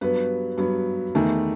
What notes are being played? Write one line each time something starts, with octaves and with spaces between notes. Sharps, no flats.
G2 F#3 B3 B4
G2 F#3 B3
E2 D#3 A3